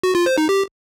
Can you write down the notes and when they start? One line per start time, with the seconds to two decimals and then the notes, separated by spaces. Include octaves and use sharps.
0.03 F#4
0.15 F4
0.26 C5
0.38 D#4
0.49 G4